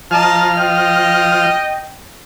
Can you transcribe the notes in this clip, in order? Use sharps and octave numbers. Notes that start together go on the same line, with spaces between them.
F3 D#5 A5 A#5 F6
D#5 G5